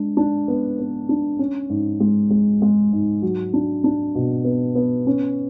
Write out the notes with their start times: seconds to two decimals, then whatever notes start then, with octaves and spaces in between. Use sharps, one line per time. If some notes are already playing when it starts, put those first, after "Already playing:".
Already playing: G#3 D4
0.17 D4
0.48 B3
0.79 B3
1.09 D4
1.39 C#4
1.69 G#2
2.00 G#3
2.31 G#3
2.62 G#3
2.93 G#2
3.22 F#3
3.54 D4
3.84 D4
4.15 B2
4.45 B3
4.75 B3
5.07 C#4